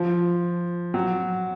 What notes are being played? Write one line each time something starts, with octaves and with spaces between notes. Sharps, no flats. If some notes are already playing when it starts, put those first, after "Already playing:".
Already playing: F3
F#3